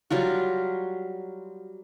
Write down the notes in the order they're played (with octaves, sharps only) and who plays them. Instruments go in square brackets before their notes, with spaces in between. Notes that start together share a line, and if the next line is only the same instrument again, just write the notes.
[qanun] F#3 G3 F4 F#4